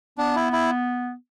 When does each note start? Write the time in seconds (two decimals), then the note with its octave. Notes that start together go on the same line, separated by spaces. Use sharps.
0.18 B3 D4
0.36 E4
0.53 E4